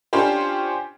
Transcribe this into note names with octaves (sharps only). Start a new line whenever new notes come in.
C#4 D4 F4 G4 C5